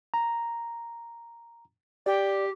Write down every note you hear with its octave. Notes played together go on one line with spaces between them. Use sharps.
A#5
G4 D5